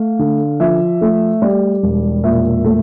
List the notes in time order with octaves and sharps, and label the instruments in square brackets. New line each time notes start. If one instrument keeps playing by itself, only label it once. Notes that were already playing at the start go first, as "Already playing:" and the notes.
Already playing: [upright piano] A3 F5
D3
F3 E5
A3
G3 D5
E1
A#2 E5
A3